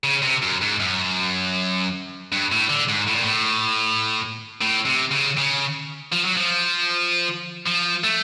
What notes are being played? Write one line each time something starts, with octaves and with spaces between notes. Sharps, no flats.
C#3
C3
F#2
G#2
F#2
G2
A2
D3
G#2
A2
A#2
A2
A2
C3
C#3
C#3
F3
F#3
F3
F3
A3